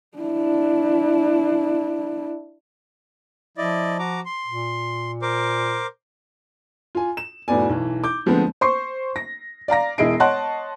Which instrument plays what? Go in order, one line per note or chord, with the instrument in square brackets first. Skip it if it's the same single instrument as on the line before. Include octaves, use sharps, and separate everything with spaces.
[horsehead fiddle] D4 E4
[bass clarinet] F3 [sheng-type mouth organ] E4 D5 D#5
[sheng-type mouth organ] F#4 A#5 D6
C6
[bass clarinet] A#2
[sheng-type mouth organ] A#4 C5 D6
[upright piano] F4 G#5
E7
F1 A2 B3 F#4 D5 G#5
B1 E3
D6 G6
D3 F3 G#3 A3 B3 C4
[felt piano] C5 C6 C#6 C7
A#6
D5 F5 A#5 A#6
E1 E4 G#4 D#5 C7 D7
C#5 D#5 F#5 A5 C6 F#6